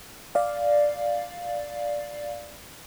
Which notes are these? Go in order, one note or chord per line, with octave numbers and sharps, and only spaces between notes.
D5 F5